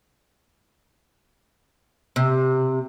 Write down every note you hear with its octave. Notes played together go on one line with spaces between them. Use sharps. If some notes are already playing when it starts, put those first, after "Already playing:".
C3